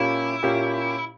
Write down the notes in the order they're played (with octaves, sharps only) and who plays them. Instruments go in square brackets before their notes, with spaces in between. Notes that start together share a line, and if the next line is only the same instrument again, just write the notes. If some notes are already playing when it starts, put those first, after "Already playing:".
Already playing: [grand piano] A#2 A#3 C#4 G4 [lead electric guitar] E4
[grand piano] A#2 A#3 C#4 G4